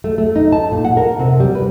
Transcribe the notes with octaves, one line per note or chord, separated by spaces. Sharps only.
A3
A3
D#4
A5
A#2
F#5
A#4
C3
G3
B4